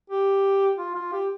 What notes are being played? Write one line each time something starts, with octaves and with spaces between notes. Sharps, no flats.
G4
F4
F4
G4